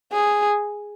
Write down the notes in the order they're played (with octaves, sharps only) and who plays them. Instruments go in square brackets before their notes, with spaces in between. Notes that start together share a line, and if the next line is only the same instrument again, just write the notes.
[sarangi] G#4